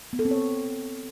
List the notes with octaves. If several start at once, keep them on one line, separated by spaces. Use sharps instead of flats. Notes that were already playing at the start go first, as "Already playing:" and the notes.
B3
A4
C4
C#5